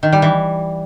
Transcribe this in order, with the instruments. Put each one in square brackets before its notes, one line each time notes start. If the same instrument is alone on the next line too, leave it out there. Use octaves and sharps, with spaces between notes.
[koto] D#3
G3
E3